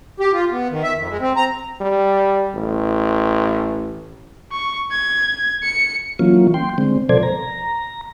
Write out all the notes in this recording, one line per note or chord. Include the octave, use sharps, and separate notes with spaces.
G4
F4
B3
D#3
E5
F2
G#3
C4
A#5
G3
A1
C#6
G#6
C#7
E3 F#3 A#3 C#4 F4
G5 C6
D3 G#3 C4
B2 F3 A4 C5 D5 G#6
A#5